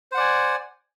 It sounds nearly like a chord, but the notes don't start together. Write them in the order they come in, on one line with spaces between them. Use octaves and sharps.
C5 F#5 D5 G#5